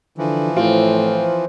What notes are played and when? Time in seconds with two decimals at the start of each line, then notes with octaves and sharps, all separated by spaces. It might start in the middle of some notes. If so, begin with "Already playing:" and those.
0.18 D3 E3 F3
0.56 A2 C4 F4